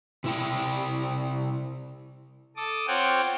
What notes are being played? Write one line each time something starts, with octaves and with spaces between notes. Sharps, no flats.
C3 E4 G5
A4 D6 D#6
C4 F4 C#5 F#5 G5